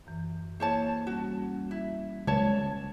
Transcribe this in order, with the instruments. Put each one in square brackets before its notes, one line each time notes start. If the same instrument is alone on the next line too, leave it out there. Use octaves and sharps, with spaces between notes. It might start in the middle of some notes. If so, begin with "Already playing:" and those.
[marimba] F#2 E3
[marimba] A#3 E4 [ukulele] C5 C#5 A5
[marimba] G3 C#4 [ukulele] F#4
[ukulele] E4
[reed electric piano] C#2 G#6 [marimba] F#3 G#3 [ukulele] C#5 A5